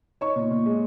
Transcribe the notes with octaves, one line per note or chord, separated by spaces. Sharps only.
D#4 C#5 C#6
A#2
A#2
G#3